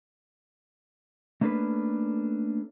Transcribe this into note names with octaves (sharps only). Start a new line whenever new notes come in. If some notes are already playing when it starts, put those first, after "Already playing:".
A3 A#3 C#4 D4 A4 B4